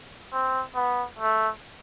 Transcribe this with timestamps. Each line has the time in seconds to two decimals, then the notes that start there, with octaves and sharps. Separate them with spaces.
0.33 C4
0.75 B3
1.19 A3